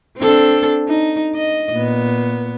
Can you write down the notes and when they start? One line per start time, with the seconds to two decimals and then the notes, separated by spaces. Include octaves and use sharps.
0.18 C4 D4 A4
0.89 D#4
1.35 D#5
1.73 A#2 B3